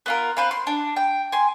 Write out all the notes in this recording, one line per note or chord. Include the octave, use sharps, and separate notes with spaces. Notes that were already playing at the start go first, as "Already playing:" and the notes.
B3 F4 A#4
C4 B4 F5
C6
D4
G5
G#5 C6